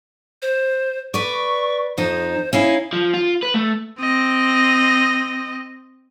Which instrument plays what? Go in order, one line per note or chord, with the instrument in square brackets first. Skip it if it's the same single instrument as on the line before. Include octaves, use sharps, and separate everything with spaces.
[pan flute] C5
[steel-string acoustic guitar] B4 D5 [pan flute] C#6
[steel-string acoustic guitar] F2 D#4 [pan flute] C5
[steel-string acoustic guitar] C#4 D#4 E4 [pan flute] F5
[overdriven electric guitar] F3
F4
B4
A3
[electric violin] C4 D#5